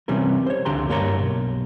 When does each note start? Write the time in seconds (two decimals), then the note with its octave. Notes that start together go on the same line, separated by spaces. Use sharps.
0.08 C3 E3 G3 C#4 A#4
0.46 C5 C#5
0.65 C#2 D3 G4 A#5 C6
0.89 G2 A#3 A#4 C#5 D#5 A#5
1.19 B1